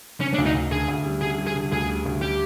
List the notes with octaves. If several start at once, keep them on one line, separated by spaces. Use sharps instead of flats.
D3 C#4
D4
D2
D#4
D2
D3 G#4
D2
G3
D3 G#4
G3
G#4
D3
D2 G#4
G3
D2
G3 G4